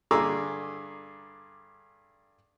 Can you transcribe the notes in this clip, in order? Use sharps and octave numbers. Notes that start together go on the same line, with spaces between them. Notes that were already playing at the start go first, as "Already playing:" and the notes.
G2 D3 G#4 A#5 D6 E6